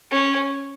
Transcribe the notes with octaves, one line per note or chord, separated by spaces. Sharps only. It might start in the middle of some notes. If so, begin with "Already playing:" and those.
C#4